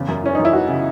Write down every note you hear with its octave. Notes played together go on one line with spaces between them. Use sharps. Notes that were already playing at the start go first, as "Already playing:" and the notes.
Already playing: E2 C#3
F#2
E3 C#4
D#4
F#2
E4
E3 F#4
C#3